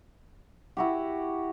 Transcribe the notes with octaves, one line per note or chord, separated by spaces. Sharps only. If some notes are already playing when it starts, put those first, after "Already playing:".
E4 F#4 G4